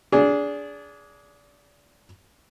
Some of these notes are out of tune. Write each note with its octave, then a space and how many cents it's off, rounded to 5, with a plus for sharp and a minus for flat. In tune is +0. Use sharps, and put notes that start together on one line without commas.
D4 -25 G#4 +0